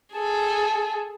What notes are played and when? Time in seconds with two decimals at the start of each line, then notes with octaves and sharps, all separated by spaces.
0.13 G#4 A4